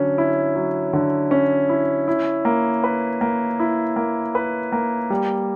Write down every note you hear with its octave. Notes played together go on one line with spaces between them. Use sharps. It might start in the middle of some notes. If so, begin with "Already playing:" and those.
Already playing: D3 F#3 C#4
E4
F#3
D3
C#4
E4
E4
A#3
B4
A#3
E4
A#3
B4
A#3
G3